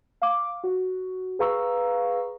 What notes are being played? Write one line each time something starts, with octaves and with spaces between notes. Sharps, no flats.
F5 D6
F#4
G#4 B4 F5 A#5 C#6 E6